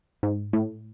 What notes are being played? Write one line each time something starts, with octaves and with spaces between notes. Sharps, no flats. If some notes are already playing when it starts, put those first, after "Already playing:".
G#2
A2